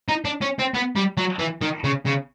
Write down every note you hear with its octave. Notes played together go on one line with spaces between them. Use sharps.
D#4
D4
C#4
C4
B3
G3
F#3
E3
D#3
C#3
C#3